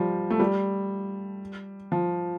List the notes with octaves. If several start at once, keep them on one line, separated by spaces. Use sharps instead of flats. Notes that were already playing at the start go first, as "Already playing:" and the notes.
Already playing: F3 G3
A3
G3
F3